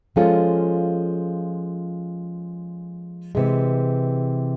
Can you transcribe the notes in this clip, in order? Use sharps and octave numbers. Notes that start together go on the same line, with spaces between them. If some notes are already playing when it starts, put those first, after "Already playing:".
F3 G#3 C#4 F4 A4
C3 E3 G#3